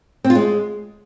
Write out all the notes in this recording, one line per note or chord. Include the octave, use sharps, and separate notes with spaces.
C4
F4
G#3